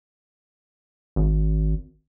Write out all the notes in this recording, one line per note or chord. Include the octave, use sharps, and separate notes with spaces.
G#1